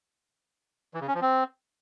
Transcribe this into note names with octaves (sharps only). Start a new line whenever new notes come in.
E3
C#3
C#4
F3
C4